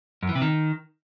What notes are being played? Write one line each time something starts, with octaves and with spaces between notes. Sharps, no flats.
F#2
E3
C3
D#3